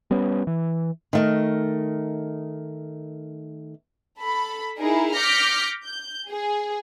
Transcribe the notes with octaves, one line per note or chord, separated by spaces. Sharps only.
G3 B3 C#4
E3
D#3 A3 A#4
A4 B5
D#4 E4 G#4 A#4
D6 F6 G6 A#6 B6 C#7
G6
G#4